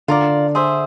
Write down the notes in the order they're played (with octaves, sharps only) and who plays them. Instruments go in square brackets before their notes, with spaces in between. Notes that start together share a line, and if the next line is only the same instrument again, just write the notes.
[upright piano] D3 [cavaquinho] F4 A#4 D5
[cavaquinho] G#4 C5 E5